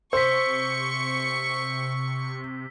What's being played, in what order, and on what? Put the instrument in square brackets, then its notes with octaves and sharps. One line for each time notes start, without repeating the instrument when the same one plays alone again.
[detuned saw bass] C3 [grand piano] C5 [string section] C#6 [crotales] E6 B6